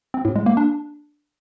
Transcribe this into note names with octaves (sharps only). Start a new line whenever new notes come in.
C4
A2
G#3
A#3
D4